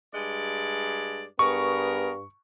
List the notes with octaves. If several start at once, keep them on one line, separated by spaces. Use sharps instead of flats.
G2 G#3 D5
G2 B3 G#4 A#4 C#6